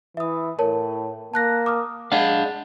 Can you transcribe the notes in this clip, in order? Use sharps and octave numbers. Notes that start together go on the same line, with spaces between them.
E3 E5 D#6
A2 A#4 C#5 A5
A#3 A5 F#6 A#6
D6 D#6 F6
G#3 D4 F5 F#5